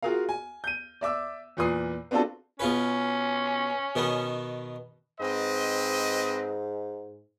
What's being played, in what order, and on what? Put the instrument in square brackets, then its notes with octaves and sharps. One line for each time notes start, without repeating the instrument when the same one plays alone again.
[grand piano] F4 F#4 G#4 A#4 F5
G#5
G6 D#7
D5 E5 D6 E6
E2 A#2 B4 D#6 C7
B3 C4 D4 F4 F#4 A4
[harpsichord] B2 F4 B4 [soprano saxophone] C#4
[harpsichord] B2 D#3 B3
[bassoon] G#2 [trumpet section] C4 B4 D#5